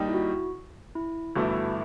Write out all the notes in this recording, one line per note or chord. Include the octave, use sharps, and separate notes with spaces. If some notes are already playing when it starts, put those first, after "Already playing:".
Already playing: D#2 D#3 G3 D#4
E4
F#4
E4
G1 G2 E3 A3 E4 F#4